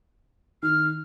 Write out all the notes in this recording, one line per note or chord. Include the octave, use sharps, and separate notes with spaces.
D#3 F6